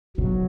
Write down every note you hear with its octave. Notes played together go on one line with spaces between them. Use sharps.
B2 F#3